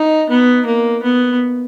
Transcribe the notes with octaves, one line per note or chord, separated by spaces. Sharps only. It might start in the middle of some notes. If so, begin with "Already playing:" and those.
Already playing: D#4
B3
A#3
B3